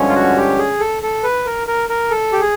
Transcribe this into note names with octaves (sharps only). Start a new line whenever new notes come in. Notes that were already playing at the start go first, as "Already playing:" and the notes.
Already playing: G2 D3 F3 G#3 C#4
F4
F#4
G4
G#4
A4
A4
B4
A#4
A#4
A#4
A4
G4
G#4